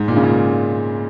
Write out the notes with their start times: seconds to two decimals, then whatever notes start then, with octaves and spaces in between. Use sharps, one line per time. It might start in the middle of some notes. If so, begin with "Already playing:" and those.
Already playing: G#2
0.08 A#2
0.16 C#3
0.23 A#2